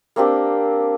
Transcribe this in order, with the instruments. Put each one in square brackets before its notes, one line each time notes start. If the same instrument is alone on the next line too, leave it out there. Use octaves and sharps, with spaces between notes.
[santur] A#3 C4 D4 G4